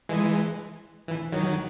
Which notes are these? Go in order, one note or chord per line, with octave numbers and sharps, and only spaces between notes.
E3 G#3
E3
D#3 F#3